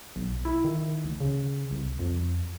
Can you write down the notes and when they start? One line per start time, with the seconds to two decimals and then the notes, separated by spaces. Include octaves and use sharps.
0.16 B1
0.45 E4
0.64 D#3
1.04 D2
1.20 C#3
1.71 C2
1.99 F2